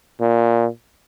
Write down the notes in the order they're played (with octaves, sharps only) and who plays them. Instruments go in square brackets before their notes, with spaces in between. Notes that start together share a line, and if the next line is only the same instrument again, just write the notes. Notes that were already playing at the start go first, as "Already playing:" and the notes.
[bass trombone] A#2